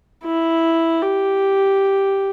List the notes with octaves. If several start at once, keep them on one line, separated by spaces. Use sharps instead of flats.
E4
G4